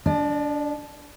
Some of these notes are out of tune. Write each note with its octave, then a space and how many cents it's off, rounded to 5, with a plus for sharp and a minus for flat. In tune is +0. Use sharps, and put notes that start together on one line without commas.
D4 -20 D5 +40